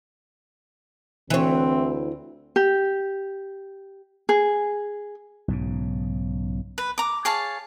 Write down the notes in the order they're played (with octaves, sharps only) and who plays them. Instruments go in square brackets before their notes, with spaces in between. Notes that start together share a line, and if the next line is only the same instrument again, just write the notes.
[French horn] D2 [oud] E3 C#5 [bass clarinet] C4
[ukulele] G4
G#4
[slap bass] B1 G#2 C#3
[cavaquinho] B4
A#5 D6
G#4 C#5 F5 A5